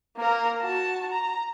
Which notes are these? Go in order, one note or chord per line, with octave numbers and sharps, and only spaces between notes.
A#3 A#4
F#4 A5
A#5